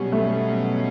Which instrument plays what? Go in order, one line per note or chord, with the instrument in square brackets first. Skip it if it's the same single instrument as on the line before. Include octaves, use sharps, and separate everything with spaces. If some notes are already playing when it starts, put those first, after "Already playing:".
Already playing: [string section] B2 F#3 C#4 [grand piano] G3
[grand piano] A3